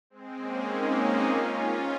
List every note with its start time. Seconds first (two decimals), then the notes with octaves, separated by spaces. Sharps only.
0.10 G#3 C4
0.38 A#3 C#4
0.67 C4 D#4
0.96 C#4 F4
1.24 C#4 F4
1.53 C#4 F4